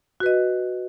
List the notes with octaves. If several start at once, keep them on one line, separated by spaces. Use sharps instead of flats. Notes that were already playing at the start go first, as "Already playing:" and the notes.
F#4 B4 D#5